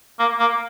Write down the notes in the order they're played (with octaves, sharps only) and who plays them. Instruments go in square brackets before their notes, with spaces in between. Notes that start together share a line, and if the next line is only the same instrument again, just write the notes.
[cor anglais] A#3
A#3